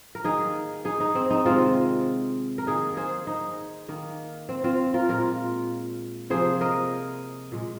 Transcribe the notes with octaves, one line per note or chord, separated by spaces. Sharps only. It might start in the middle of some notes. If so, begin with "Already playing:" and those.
A#4
D#3 A#3 D#4 G#4
D#4 G#4
D#4
C4
D#4
C3 D#3 G#3 C4 F4
A#4
D#3 A#3 D#4 G#4
G#4 C5
D#4
D#3 A#3
C4
C4 F4
F4 A#4
A#2 G#3 F4 A#4
C3 F3 A#3 G#4 C5
A#4 D#5
A#2 G#3